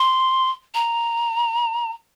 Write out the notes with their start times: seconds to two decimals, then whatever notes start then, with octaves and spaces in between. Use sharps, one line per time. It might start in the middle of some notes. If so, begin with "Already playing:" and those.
Already playing: C6
0.74 A#5